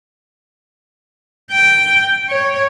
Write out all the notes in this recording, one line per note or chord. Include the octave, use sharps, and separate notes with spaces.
G5
C#5